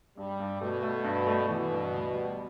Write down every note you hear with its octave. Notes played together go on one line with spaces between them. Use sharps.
G2 G3
G2
B2 A3
A3
G2
A3
B2 E3
G2
D2
G3